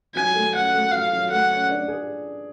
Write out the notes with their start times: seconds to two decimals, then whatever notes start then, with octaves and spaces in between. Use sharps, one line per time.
0.15 F#3 G#5
0.34 A3
0.53 C#4 F#5
0.73 A3
0.92 F#3 F5
1.12 F#3
1.30 A3 F#5
1.50 C#4
1.69 D4
1.88 G#4